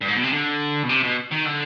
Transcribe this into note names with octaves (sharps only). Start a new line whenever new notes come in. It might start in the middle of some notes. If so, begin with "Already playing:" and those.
G2
G#2
B2
C3
D3
B2
C3
B2
D#3
D3